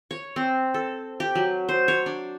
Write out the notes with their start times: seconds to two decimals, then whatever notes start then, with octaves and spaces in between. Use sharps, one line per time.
0.11 C#5
0.36 C4
0.74 A4
1.20 G4
1.35 F#3
1.69 C5
1.88 C#5
2.06 D4